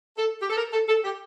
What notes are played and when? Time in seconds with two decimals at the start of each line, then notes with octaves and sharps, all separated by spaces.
0.17 A4
0.40 G4
0.49 A4
0.56 A#4
0.72 A4
0.87 A4
1.04 G4